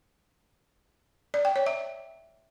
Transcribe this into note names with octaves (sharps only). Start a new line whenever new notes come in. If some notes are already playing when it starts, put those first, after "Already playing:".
D5
G5
C#5
E5